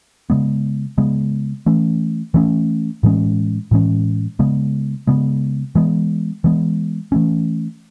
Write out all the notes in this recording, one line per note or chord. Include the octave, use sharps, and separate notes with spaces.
C#3 G#3 B3
C#3 G#3 B3
E3 A3 C#4
E3 A3 C#4
A2 E3 G#3 C#4
A2 E3 G#3 C#4
C#3 G#3 B3
C#3 G#3 B3
E3 G#3 B3
E3 G#3 B3
E3 A3 C#4